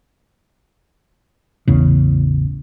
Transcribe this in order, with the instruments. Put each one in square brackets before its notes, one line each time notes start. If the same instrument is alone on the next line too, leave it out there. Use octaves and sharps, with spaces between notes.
[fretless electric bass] A1 E2 C#3